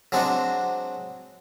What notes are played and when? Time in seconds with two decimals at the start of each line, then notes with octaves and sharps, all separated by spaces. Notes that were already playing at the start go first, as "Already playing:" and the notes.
0.12 F#3 G#3 C4 D4 F#4